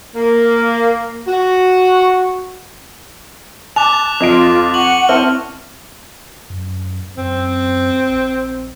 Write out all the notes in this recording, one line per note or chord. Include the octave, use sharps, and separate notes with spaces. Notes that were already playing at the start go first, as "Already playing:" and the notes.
A#3
F#4
A5 D6 F#6 F7
F2 F4 D#5 D7
F#5 C#6 F#7
C4 E4 A5 F6
F#2
F#2 C4
A#1